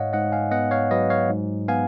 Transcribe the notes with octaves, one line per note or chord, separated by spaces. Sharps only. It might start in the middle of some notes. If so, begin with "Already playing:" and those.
Already playing: G#2 C#5 D#5 F5 F#5
G#2 D#5 F#5
F5 G#5
B3 D#5 F#5
C#5 F5
F#3 B4 D#5
C#5 F5
G#2
B3 F5 G#5